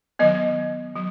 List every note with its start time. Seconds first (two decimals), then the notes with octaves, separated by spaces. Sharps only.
0.19 D#3 F#3 B3 D#5
0.96 F#3